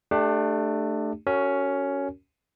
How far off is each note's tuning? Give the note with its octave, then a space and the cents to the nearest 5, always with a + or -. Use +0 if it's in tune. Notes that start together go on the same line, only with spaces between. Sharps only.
A3 +0 D4 +25 G4 +20
C#4 +10 F#4 +15 A#4 -40